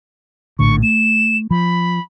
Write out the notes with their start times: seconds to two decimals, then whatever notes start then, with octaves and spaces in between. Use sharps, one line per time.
0.59 A#1 A2 D3 C#6
0.83 A3 E7
1.51 F3 B5